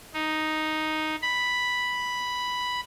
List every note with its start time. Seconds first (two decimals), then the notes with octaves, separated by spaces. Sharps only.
0.14 D#4
1.22 B5